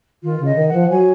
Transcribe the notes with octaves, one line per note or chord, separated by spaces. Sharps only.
D#3 F4
C#3 D#5
D#3
F#5
F3
F#3 G#5